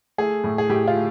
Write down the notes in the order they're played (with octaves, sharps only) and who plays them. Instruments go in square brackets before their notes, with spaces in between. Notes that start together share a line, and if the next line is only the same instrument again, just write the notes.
[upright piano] A3 G#4
A2
G#4
A2 G4
F4
A3